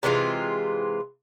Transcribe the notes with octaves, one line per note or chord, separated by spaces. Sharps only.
C3 E3 G#3 F4